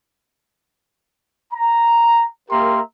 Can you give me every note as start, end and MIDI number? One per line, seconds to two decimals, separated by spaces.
1.53 2.25 82
2.50 2.81 58
2.50 2.81 67
2.50 2.81 70
2.50 2.81 76
2.50 2.81 82
2.50 2.81 84